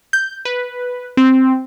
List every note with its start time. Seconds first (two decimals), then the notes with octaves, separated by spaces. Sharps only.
0.13 G6
0.45 B4
1.17 C4